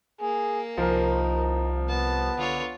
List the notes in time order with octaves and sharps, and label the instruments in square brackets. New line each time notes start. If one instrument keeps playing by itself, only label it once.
[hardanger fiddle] A#3 [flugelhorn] G#4
[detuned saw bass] C2 [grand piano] F3 A#4 [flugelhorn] D#4
[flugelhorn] B3 [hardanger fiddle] A5
[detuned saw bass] D3 [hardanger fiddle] F4 C#5